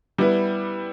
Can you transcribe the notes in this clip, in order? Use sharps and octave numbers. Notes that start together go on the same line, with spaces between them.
G3 B3 E4 B4